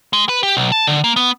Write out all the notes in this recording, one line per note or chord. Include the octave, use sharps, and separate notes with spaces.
G#3
B4
G4
B1
A5
D3
A#3
B3